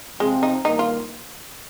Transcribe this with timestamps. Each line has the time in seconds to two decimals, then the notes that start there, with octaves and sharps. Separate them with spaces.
0.20 C3 F3 G#3 C4
0.43 D#4
0.65 G2 D#3 A#3 D#4
0.79 F4